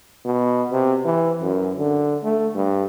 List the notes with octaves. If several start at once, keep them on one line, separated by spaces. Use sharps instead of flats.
B2
C3
E3
F#2
D3
A3
G2